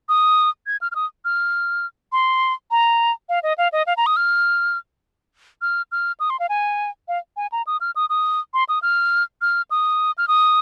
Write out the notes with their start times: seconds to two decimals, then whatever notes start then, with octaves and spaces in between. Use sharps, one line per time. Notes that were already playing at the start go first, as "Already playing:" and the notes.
0.09 D#6
0.67 G#6
0.81 F6
0.92 F6
0.95 D#6
1.25 F6
2.12 C6
2.71 A#5
3.29 F5
3.43 D#5
3.58 F5
3.72 D#5
3.87 F5
3.97 A#5
4.06 D#6
4.17 F6
5.62 F6
5.92 F6
6.20 D#6
6.30 C6
6.40 F5
6.49 G#5
7.08 F5
7.37 G#5
7.52 A#5
7.67 D#6
7.81 F6
7.96 D#6
8.10 D#6
8.54 C6
8.69 D#6
8.82 F6
9.42 F6
9.71 D#6
10.18 F6
10.28 D#6